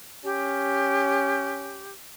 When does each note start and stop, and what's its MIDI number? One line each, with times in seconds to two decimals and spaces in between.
0.24 1.86 61
0.24 1.92 67